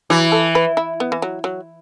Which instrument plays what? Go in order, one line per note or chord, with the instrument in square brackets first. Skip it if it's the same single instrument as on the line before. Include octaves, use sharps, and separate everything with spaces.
[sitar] E3 [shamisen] F#3
[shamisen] A4
B4
E4
B3
E3
F#3
F#3